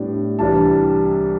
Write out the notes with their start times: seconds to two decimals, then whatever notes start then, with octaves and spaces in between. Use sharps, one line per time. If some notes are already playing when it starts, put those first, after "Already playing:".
Already playing: A2 G3 B3 D4
0.39 C2 C3 E3 G3 D4 A5